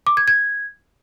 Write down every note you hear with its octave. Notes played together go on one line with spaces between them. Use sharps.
D6
G#6
G#6